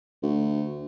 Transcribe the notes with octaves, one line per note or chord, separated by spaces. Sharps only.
D2